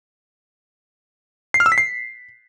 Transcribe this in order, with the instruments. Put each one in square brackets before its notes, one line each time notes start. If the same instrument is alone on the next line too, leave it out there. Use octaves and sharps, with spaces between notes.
[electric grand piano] C7
F6
E6
B6
C7